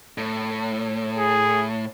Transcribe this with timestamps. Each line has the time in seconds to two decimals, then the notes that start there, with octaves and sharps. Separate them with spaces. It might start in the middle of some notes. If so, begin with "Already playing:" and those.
0.18 A2
1.18 G#4